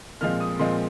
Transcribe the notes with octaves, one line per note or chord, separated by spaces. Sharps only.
A#2 F3 G#3 C4 F6
D#6
A#2 F3 G#3 C4 C6